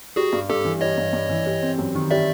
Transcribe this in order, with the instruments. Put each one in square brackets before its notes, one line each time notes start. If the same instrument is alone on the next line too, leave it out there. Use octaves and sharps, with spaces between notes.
[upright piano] G3 [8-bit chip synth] F#4 G#4
[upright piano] G2
[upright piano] G2 [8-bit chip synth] G4 A4
[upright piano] E3
[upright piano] G3 [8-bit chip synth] C#5 D#5
[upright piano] G2
G2
E3
G3
C4
F#2
D#3
[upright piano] G3 [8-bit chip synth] D5 E5